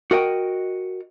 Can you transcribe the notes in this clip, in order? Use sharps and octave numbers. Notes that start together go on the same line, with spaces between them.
F#4 A#4 D#5 G5